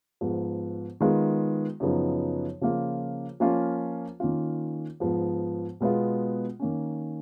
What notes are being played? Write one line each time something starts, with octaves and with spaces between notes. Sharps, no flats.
G#2 F3 B3
D#3 G#3 B3 F4
F#2 C#3 F3 B3 D#4
C#3 F3 A#3 F4
F3 A#3 C#4 F4
D#3 A#3 C#4 F4
G#2 F3 B3
B2 G#3 B3 F4
D#3 A#3 C#4